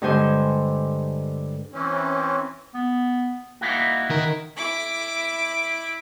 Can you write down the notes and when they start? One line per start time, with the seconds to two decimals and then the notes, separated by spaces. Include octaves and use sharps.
0.02 G2 D3 G#3 C5 G#5
1.73 E3 C4 C#4
2.74 B3
3.61 A#3 D#4 E4 F#4
4.10 D#3 A#4
4.57 E4 D6